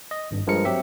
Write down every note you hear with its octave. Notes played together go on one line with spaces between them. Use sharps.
D#5
G#1 G2
G2 F3 G#3 A#4 C#7
F#3 C4 G4 E5